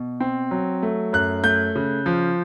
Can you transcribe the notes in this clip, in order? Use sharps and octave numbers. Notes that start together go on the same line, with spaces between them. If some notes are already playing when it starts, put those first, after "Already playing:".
Already playing: B2
C4
F#3
A3
F#2 F#6
A3 G6
C#3
F3